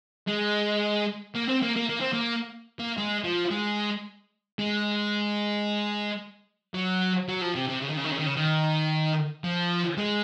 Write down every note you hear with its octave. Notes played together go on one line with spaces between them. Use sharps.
G#3
A#3
C4
A#3
A#3
A#3
C4
A#3
A#3
G#3
F3
G#3
G#3
F#3
F#3
F3
C3
C3
C#3
D#3
C#3
D#3
C#3
D#3
C#3
D#3
F3
G#3